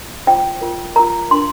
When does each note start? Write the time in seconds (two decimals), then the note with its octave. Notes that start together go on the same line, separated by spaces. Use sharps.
0.27 F4 C5 G5
0.61 F4 A#4
0.96 F4 A#4 A#5
1.31 D4 A#4 C6